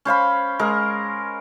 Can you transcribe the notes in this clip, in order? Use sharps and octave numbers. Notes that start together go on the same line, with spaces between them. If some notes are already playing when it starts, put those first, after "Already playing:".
C#4 C5 F5 B5
G#3 A#4